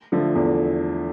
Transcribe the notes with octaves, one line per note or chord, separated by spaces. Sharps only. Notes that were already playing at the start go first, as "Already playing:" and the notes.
D3 F3 A3
E2